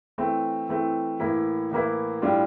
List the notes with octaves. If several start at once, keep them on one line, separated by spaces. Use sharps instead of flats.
E3 A3 C4
E3 A3 C4
A2 E3 A#3 E4
A2 E3 A#3 E4
A2 G3 D4 F4